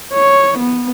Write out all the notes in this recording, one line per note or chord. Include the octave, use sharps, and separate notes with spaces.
C#5
B3